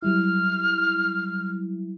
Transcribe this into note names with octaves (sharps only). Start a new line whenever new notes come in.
F#3 G3 E4 F6